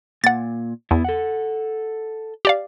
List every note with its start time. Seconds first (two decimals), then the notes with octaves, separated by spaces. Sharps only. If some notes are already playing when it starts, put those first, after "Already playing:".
0.24 A#2 F#5 A6
0.91 E2 B3 E4
1.04 A4 F#5
2.45 G4 D5 F5